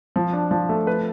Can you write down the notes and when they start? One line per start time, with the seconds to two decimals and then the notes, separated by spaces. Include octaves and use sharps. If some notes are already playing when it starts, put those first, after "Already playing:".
0.16 F3
0.33 D4
0.51 F3
0.69 A3
0.87 B4